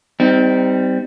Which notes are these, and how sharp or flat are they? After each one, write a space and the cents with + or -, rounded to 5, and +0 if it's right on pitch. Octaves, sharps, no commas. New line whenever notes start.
G3 +0 C4 -30 D#4 +15